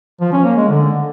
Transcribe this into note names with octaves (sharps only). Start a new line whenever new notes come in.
F3
C#4
A#3
G#3
D3